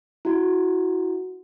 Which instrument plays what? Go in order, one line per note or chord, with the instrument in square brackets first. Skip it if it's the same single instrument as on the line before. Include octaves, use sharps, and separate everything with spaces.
[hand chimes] E4 F#4